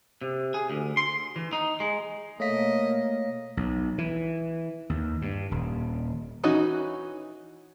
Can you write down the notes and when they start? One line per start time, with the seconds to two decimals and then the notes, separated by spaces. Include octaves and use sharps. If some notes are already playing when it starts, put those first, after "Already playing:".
0.22 C3
0.54 G#4
0.70 D2
0.97 C6
1.36 E3
1.53 D#4
1.80 G#3
2.40 B2 A3 A#3 C#5 D#5 F5 B6
3.57 B1
3.98 E3
4.90 D#2
5.22 G2
5.51 D#1
6.44 E3 C#4 D#4 F#4